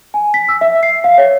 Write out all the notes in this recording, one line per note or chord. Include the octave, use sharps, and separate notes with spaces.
G#5
B6
E6
E5
C7
F5
C#5